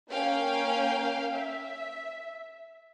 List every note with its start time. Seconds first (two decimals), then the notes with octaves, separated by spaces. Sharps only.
0.11 A#3 C#4 F5 G5
1.34 E5